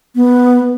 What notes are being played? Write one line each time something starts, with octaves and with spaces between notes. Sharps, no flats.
B3